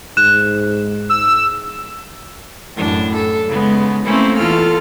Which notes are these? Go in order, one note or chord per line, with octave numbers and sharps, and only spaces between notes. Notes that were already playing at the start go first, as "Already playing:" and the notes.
G#2 F#6 E7
E6
F#2 A2 D4
A4
C#3 G#3 B3
A3 A#3 C4 C#4 E4
E2 F4 A4 F6